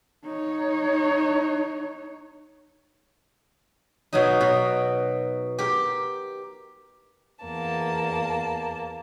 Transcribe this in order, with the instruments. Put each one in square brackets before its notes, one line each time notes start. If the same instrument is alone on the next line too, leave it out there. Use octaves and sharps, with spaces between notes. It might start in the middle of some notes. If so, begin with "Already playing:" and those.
[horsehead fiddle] D#4 C#5
[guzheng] B2 F#3 D#4
B2
G4 A#4
[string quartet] E2 A#3 A5